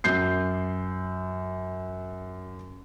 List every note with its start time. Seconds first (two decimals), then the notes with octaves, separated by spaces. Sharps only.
0.04 F#2 G6 C7